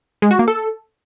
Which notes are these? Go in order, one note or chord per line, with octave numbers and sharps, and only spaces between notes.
G#3
F#4
A#3
A4